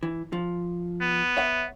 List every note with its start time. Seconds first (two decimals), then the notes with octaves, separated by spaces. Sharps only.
0.03 E3
0.33 F3
1.01 B3
1.37 C#5 E5 F#5